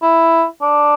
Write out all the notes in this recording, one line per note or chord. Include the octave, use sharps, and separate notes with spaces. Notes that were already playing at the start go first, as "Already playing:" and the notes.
E4
D4